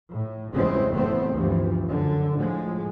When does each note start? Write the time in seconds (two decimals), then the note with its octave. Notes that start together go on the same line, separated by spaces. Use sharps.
0.11 A2
0.53 E2 G2 C#3 E3 G#3 C4
0.91 F#1 E2 A2 A3 B3 C4
1.32 D2 G2 E3 F3
1.85 F#2 D3
2.34 A2 F3 G#3